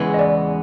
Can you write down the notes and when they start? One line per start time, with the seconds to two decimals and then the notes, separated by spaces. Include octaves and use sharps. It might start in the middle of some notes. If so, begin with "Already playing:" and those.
Already playing: E2 C#3 E3 G#3 B3
0.14 D#5
0.19 D5